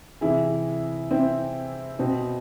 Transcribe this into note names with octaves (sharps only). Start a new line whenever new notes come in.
C3 E3 E4 G#4
C4 E4
B2 C4